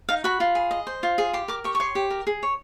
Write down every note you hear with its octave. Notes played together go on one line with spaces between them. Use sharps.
D#4 F5
F#4 B5
F4
G#4
D#5
C5
F4
G#4
G4 C6
A#4 D6
G4 C#6
C#6
C#5 C6
G4
A#4
G#4
C#5